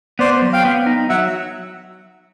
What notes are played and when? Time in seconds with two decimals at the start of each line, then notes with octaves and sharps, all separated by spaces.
0.19 B3 C5 D5
0.42 F#3
0.53 F5 G5
0.65 B3
0.86 D#4
1.09 F#3 E5 F#5